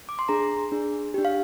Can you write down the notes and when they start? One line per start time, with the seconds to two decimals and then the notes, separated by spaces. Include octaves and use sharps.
0.09 D6
0.19 C6
0.29 D4 G#4 A#5
0.72 D4 G#4
1.14 D4 G4
1.25 F5